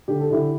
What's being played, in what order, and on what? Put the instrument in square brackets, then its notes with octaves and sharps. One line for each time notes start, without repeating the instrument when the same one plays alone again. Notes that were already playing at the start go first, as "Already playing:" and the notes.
[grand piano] D3 G4
A4
D3 E4 G4